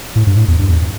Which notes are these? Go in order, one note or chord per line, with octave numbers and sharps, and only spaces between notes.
A2
G2
A2
E2
G2
E2